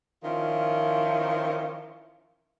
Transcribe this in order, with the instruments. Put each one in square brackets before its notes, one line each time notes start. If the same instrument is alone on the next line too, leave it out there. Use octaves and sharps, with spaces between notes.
[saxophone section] D#3 F3 C#4 E4 F4